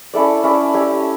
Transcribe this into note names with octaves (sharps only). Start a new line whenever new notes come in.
C#4 E4 A4 D5
C#4 E4 A4 D5
C#4 G4 C#5 E5